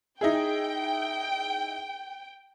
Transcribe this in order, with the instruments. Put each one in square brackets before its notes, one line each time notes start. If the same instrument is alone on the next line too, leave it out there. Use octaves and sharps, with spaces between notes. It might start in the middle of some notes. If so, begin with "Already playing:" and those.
[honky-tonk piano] D#4 E4 G#4 [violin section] G5